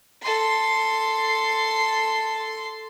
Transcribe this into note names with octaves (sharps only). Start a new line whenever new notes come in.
A4 C6